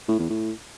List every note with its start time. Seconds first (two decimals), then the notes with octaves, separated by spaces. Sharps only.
0.08 A2
0.19 E2
0.30 A2